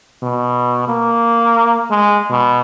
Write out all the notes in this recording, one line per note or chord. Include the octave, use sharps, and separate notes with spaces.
B2
A#3
G#3
B2